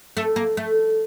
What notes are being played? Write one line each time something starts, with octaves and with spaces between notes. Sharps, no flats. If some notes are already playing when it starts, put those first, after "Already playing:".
A3
A#3
A3